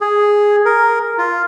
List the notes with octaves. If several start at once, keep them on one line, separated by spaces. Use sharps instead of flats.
G#4
A#4
F4